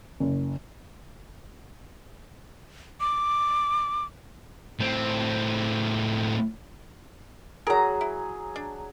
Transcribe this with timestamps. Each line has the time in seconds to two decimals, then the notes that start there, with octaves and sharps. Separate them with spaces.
0.20 F#1
3.00 D6
4.79 A2 C4
7.67 F#3 G#4 A#4 A#5
8.01 E4
8.56 D4